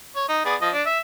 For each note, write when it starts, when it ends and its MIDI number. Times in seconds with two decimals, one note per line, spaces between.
0.16 0.24 73
0.29 0.41 63
0.45 0.55 59
0.45 0.55 68
0.45 0.55 74
0.61 0.71 53
0.61 0.71 75
0.74 0.83 62
0.86 0.99 76